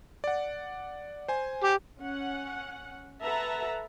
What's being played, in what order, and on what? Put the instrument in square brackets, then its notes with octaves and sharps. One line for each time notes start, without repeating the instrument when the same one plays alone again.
[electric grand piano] D5 F#5
C5 G#5
[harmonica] G4
[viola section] C#4 F#5
A4 B4 E5 F#5 A5 A#5